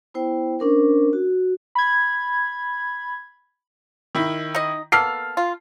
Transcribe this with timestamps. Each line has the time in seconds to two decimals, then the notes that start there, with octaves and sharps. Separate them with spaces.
0.14 B3 E4 C5 G5
0.59 C#4 D4 A#4 C5
1.13 F#4
1.75 B5 G#6
4.15 D#3 E4
4.55 D#4 D#5
4.92 A#3 B3 A4 F6 C7
5.37 F4